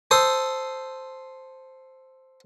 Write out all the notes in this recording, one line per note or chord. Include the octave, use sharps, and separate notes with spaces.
A4 C5 D#6